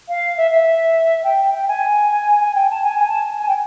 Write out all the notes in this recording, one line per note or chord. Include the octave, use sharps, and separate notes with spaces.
F5
E5
E5
G5
G5
G#5
G#5
G5
A5
G#5
G#5
A5
G#5
G5